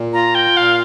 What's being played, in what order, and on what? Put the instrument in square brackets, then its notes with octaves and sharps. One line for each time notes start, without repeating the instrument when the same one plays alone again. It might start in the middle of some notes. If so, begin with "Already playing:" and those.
Already playing: [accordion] A#2
[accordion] F4 [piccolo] A#5
[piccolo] G5
[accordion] A#2 [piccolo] F5